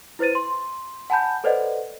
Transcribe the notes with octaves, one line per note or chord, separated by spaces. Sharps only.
E4 B4 C5 A6 D#7
C6
F#5 G#5 A5 B5 G6
A4 B4 C5 D5 D#5 F#5